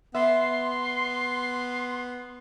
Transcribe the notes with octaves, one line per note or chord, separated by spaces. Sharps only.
B3 E5 C6